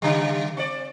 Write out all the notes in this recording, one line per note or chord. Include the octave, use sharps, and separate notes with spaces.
C#3 G3
C4 D5